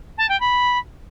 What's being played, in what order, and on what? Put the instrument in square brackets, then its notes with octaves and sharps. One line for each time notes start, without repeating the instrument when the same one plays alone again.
[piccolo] A5
G5
B5